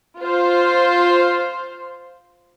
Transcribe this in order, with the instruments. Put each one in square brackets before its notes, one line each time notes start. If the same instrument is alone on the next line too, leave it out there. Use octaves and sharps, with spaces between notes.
[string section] F4 C5